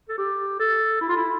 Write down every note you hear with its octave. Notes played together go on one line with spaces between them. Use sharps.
A4
G4
A4
E4
F4
E4